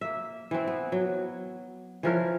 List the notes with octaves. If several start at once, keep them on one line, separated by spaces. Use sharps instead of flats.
A#3 E5
E3 C4
B3
F#3
E3 F3 A#4 C#5